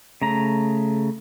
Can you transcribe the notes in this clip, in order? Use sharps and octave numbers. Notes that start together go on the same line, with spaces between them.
C#3 A3 A#5